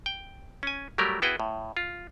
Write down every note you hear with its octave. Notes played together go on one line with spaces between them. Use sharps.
G5
C#4 G#5
F#3 G3 A3 G4 A#4
B3 E4 F#4 G#4 B4 G5
A2
F4